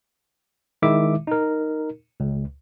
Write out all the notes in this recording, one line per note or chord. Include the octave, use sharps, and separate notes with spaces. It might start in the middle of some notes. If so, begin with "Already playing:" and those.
D#3 G#3 E4 E5 D6
D#4 A#4
C#2